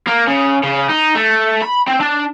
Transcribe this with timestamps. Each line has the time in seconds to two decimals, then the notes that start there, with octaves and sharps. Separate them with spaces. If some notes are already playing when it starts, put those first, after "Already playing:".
0.07 A#3
0.28 C#3
0.64 C#3
0.89 D#4
1.15 A3
1.62 B5
1.88 C4
2.00 D4